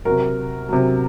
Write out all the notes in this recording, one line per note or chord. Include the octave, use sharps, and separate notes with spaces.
C3 F#3 F#4 A#4
C3 F#3